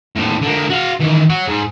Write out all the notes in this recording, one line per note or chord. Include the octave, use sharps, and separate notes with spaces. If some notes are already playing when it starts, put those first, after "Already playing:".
D#2 A2
D3 A#3
F#4 F5
D#3 E3
C#5 F#5
G#2